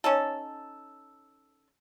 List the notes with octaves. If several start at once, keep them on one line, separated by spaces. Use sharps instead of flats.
C#4 D#4 A4